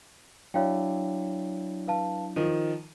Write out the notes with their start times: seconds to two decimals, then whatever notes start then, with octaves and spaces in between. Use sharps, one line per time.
0.54 F#3 D4 E4 C#5 F5 G5
1.87 B4 F5 A5
2.36 D#3 F3 D#7